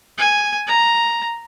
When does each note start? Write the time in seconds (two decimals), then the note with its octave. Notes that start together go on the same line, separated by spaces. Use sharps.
0.18 G#5
0.67 A#5